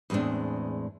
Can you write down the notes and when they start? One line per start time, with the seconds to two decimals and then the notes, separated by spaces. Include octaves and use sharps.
0.10 E2 A2 G#3 C4 D4